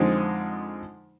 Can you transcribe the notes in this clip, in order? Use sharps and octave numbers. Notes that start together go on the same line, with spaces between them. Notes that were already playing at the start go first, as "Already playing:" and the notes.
Already playing: F2 D3 G#3 C4 D#4